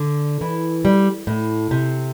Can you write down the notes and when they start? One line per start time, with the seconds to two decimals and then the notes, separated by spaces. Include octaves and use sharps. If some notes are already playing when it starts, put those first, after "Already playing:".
Already playing: D3
0.41 E3
0.85 G3
1.27 A2
1.71 C3